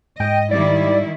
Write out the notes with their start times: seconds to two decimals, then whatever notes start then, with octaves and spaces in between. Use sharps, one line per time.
0.20 G#2 D#5 G5
0.51 D#3 G3 E4 D5